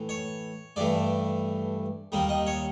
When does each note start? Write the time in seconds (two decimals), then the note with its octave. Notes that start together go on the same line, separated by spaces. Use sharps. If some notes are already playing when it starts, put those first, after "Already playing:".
Already playing: A2 E3
0.09 C#5
0.76 G2 E3 A3 D5
2.12 D#2 D#3 G3 A#3
2.29 D#5
2.47 C#5